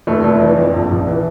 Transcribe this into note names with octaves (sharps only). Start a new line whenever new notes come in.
F1 A3
F1
E3
F2
A#1
A#1
E3